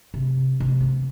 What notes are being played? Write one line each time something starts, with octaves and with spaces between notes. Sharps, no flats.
C3
C3
B3